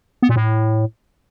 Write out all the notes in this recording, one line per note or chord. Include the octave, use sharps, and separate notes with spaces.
B3
A#2
A2